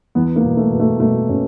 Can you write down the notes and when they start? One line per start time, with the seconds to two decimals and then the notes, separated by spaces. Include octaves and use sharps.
0.15 E2 B3
0.36 A#3
0.44 B2
0.57 A3
0.72 B2
0.80 A3
1.00 B2 A3
1.29 B2 C#4